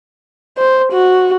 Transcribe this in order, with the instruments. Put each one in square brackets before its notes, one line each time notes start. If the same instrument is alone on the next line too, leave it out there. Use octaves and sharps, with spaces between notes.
[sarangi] C5
F#4